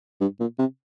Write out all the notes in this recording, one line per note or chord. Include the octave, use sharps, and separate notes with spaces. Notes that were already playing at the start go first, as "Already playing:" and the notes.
G2
A#2
C3